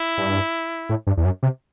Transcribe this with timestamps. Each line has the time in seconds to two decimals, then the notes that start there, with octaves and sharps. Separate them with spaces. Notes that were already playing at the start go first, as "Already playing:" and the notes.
Already playing: E4
0.18 G2
0.89 A2
1.07 G2
1.17 E2
1.25 F#2
1.43 C3